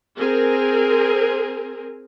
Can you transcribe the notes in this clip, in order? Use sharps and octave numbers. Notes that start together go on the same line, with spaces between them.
C4 G#4 A#4